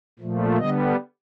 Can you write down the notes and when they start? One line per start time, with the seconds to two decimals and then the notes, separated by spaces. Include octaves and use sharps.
0.19 A#2 F3 A3
0.58 D3 G3 B3 D#5